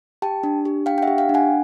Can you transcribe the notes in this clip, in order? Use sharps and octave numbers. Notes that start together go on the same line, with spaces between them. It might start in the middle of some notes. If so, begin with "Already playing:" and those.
G4 G5 A5
D4
G4
D4 F5 G5
G5
E5 F#5
G4
F5 G5
D4
F#5 G#5